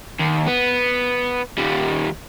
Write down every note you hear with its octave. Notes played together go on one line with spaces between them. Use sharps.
D#2
B3
D#2 G3